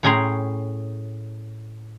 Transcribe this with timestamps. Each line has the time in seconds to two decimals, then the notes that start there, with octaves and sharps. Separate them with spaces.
0.03 A2 C#4 G#4 G5 A#5 C6